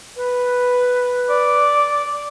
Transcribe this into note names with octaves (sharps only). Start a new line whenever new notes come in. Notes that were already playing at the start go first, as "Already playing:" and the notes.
B4
D5